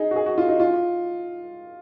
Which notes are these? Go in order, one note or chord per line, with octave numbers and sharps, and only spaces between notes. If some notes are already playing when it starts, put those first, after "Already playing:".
Already playing: D#4 G#4
F#4
G#4
F#4
F4
D#4
F4